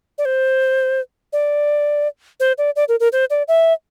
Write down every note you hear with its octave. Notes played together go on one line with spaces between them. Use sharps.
D5
C5
D5
C5
D5
D5
A#4
A#4
C5
D5
E5